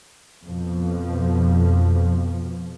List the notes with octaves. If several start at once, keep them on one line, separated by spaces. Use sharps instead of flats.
F2 B2 F3